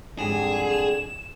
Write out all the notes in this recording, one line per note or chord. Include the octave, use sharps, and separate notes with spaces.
F2 G#2 D3 G3 G#4 E7